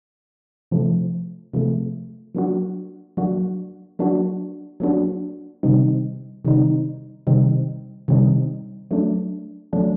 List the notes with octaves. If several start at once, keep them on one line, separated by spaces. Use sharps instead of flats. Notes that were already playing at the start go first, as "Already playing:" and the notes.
C3 F3 A3
C3 F3 A3
F#3 A#3 D4 F#4
F#3 A#3 D4 F#4
F#3 A#3 D4 F#4
F#3 A#3 D4 F#4
C3 D#3 G3 C4 D#4
C3 D#3 G3 C4 D#4
C3 D#3 G3 C4 D#4
C3 D#3 G3 C4 D#4
F#3 A3 D4
F#3 A3 D4